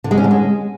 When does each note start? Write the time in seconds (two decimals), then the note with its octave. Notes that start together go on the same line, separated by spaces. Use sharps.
0.04 D3
0.11 G#3
0.17 C#4
0.24 D3
0.31 G#3